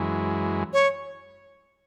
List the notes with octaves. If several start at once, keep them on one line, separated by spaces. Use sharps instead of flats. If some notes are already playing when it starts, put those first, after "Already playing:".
Already playing: F#2 E3 G#3
C#5